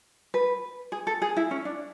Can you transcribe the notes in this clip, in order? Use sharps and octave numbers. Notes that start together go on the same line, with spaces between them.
B4
G#4
A4
G#4
E4
C#4
D4